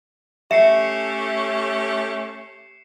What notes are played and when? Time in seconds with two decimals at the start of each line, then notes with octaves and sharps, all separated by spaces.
0.51 A3 C#4 G4 E5 C7 C#7 E7